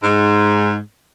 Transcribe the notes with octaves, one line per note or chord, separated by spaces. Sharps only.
G#2